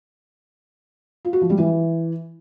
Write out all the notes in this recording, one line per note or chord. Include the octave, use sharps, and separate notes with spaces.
F4
F#4
F3
G3
E3